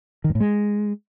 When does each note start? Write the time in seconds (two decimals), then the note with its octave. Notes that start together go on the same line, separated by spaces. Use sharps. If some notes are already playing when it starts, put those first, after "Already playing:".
0.24 D#3
0.30 G2
0.35 A2
0.40 G#3